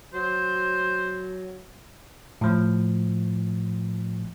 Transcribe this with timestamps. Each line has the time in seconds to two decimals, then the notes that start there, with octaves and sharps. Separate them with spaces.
0.14 F#3 C5
2.41 A2 F3